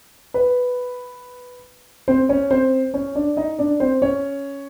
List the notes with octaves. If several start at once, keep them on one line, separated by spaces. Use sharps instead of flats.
B4
C4 C5
C#4 C#5
C4 C5
C#4 C#5
D4 D5
D#4 D#5
D4 D5
C4 C5
C#4 C#5